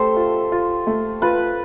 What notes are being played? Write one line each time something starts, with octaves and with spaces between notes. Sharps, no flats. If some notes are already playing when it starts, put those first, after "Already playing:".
Already playing: A3 G4 A4 C5
F4
F4
A3
F4 B4